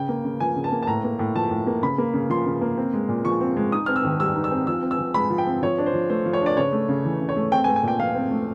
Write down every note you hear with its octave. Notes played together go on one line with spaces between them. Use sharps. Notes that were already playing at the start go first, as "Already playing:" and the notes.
Already playing: C#3 G5
A#3
C#3
F3 G#5
C#3
A5
A#3
A5
A2 A#5
A#3
A2
F3 A5
A2
A#3
C#3 B5
A#3
C#3
F3 C6
C#3
A#3
C4
G#3
A#2
F3 C#6
C4
G#3
D#4 D#6
C4 F6
E6
D#3
G3 E6
D#4
E6
C4
F3 E6
C4
E6
F3
G#3 B5
F3
G5
C4
F3 C#5
D4
C5
F3
A3 C5
F3
C#5
D4 D5
C#3 C#5
A3
C#3
E3
C#3
C#5
A3
C4 G5
G#5
A3
G#5
A#2 G5
F3 F5
C4
A3